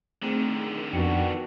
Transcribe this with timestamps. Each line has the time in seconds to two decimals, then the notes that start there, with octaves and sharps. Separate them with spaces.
0.22 D3 D#3 A3 C4 G#4
0.93 F2 B3 D4 F#4 G5 C#7